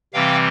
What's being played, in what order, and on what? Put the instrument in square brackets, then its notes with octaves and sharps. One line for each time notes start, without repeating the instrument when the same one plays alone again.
[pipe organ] C3 E3 G3 C4 F5 G5